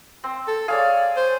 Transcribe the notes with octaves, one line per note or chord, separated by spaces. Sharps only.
C4
A4
G#4 C#5 D5 F5
C5